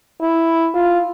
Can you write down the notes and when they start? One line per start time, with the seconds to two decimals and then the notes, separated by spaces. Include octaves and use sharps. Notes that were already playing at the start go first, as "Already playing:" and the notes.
0.21 E4
0.74 F4